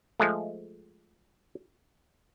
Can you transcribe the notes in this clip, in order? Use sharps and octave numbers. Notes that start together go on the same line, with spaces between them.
F3 G#3 A3